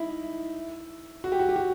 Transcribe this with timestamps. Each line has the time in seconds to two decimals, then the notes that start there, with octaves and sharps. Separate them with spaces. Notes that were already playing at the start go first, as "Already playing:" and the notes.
Already playing: D#4 E4
1.24 F#4
1.32 G4
1.39 F#4
1.49 G4
1.56 F#4